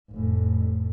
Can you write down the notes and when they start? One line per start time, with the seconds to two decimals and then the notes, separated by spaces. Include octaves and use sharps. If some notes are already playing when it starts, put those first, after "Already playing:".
0.11 F1 A2